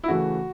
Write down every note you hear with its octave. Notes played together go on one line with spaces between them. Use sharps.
E4
C#3 E3 A3 F#4